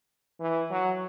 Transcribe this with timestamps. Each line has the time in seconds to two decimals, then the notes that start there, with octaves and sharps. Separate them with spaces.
0.40 E3
0.70 F#3